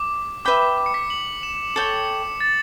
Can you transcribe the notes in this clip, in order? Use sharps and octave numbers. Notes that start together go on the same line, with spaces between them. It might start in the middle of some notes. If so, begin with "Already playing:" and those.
Already playing: D6
B4 E5 G5 B5 D6
D6
C#7
B6
F#7
E7
A4 C#5 G5 C#7
A6